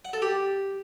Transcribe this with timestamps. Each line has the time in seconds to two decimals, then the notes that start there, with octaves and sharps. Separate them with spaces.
0.05 F#5
0.13 A4
0.22 G4